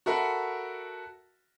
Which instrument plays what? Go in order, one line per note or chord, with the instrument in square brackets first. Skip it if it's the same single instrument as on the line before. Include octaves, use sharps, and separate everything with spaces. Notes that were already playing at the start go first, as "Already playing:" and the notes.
[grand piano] F#4 A4 A#4 E5 F#5 B5